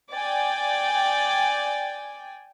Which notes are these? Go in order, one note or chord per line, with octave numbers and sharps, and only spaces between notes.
D5 G5 G#5